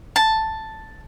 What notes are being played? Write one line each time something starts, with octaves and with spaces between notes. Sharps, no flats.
A5